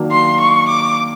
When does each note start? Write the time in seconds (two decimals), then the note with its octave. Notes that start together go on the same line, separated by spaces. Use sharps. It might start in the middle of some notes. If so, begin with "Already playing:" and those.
Already playing: D#3 F#3 A#3 D4
0.11 C6
0.41 C#6
0.69 D6